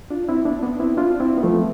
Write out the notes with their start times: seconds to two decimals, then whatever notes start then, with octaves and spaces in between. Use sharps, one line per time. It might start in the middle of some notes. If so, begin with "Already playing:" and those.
0.11 D4 F4
0.29 C4 E4
0.45 B3 D4
0.63 B3 D4
0.80 C4 E4
0.97 D4 F4
1.20 C4 E4
1.38 B3
1.43 F3 A3